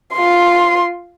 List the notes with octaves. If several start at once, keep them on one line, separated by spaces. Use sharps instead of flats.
F4 C6